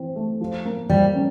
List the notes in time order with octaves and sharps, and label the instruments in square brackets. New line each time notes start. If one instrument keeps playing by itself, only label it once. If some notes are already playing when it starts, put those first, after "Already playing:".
Already playing: [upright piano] E3 C4
A3
F3
A#3
[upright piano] F3 [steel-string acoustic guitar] G3
[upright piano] C#4